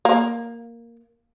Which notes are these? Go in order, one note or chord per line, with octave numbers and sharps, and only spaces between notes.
A#3